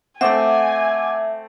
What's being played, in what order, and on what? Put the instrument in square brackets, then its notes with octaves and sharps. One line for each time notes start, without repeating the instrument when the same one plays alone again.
[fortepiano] A3 C4 [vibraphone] E5 [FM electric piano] F#5 D6 [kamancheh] G#5